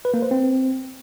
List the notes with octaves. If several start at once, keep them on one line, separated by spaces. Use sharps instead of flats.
B4
A#3
C5
C4